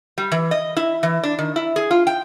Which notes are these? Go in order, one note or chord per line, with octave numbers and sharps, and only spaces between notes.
G3
E3
D#5
E4
E3
D4
D#3
E4
G#4
F4
G5